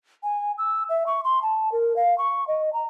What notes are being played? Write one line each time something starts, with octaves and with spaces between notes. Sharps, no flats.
G#5
E6
E5
C#6
C6
A5
A#4
F5
C#6
D#5
A#5